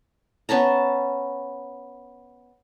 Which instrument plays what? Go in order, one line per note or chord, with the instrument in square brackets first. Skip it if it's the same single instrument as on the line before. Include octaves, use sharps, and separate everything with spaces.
[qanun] B3 C#4 A5 A#5